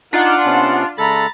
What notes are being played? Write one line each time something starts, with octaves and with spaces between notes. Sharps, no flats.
D4 D#4 F4 F#5
C3 B3 C#4
C#3 G#3 A4 A#5 B5 A6